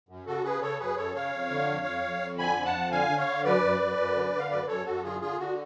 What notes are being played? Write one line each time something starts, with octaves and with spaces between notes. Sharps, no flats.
F#2
C#3 F#4 A4
C#3 G#4 B4
C#3 A4 C#5
F#2 G#4 B4
F#2 A4 C#5
C#3 C#5 F5
F2
D3
F2
F2
F2
F2
D3 G#5 B5
F2
F#5 A5
F2
D3 F5 G#5
D3
C#5 F5
D3
F#2 B4 D5
F#2
F#2
F#2
D3
D3
F5
F#2 B4 D5
F#2 A4 C#5
F#2 F#4 A4
D3 F4 G#4
D3 F4 G#4
D3 F#4